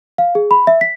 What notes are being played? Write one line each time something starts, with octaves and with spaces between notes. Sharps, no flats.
F5
G#4
B5
E5
B6